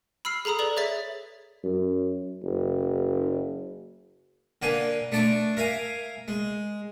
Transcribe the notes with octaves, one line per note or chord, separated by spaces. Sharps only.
B5 E6 F6 C7
G#4 A4 A#5 B5 D#6
G#4 A4 B4 D5 F#7
G#4 C#5 E5 A6 B6
F#2
F#1
D3 A#3 B4 G#5
A3 D4 A5 D6
A#4 E5 F5 G#5
G#3